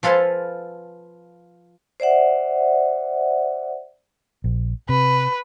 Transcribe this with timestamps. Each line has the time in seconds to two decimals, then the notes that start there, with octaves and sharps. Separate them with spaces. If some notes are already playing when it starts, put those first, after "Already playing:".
0.03 F3 F4 A4 B4 G#5 C6
2.00 C5 D5 E5 F#5
4.44 A#1
4.89 C3 B4